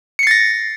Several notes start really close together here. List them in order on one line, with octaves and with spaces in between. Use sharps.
C#7 C7 A6 A#6